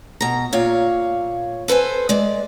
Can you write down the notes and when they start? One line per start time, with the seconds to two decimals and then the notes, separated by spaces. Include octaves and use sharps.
0.21 B2 A#5
0.53 A#2 C#5 F5
1.68 A4 B4 C5 G#5
2.09 G#3 D5